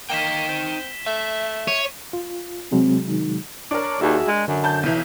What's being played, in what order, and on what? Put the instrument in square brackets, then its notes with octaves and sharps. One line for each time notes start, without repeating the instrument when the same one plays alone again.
[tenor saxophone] A#3 [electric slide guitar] D#4 D#5 G5 [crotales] B6 E7 G7
[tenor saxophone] C4
[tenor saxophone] A3 [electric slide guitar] E5
[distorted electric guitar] C#5 [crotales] D#7
[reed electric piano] F4
[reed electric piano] C3 F#3 G#3 [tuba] C4
[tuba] D#3
[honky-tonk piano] D4 A#4 [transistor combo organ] C#5 D6
[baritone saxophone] D#2 [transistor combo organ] F#4 G#4 E5
[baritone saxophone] G#3
[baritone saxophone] F#2 [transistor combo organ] D3
[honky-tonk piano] A5 G6
B1 E3